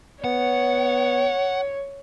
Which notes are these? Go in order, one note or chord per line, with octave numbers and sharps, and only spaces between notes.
B3 C#5 F#5